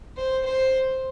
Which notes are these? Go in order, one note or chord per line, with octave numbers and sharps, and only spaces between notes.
C5
C5